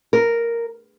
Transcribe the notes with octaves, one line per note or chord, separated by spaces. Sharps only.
A#4